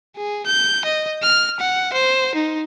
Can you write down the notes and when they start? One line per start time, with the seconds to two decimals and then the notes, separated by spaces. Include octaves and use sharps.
0.16 G#4
0.46 G6
0.85 D#5
1.22 F6
1.59 F#5
1.93 C5
2.35 D#4